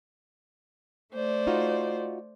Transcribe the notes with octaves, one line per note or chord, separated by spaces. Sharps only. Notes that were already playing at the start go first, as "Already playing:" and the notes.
A3 C5 D5
D#4 F4 F#4